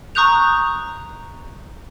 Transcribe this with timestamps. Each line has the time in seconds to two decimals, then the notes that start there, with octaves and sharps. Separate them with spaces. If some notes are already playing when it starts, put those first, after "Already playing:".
0.15 A#5 C#6 D#6 F#6 G6 F7